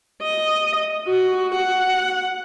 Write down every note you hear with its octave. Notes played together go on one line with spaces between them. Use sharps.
D#5
F#4
F#5